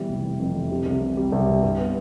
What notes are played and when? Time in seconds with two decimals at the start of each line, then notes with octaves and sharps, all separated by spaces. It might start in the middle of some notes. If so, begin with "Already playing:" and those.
Already playing: B2 E3 G3
0.09 F1
0.24 E3
0.40 F2
0.55 E3
0.71 C3
0.86 C2
1.01 C3
1.17 G3
1.32 C2
1.47 G3
1.63 G2
1.78 B3